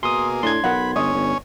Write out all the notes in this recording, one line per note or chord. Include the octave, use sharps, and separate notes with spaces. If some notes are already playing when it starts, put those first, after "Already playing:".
B2 A#3 G#4 C6 D#6
A2 D4 C6 G#6
B1 A#4 F#5 B5
G1 C#4 C#5 D#5
G1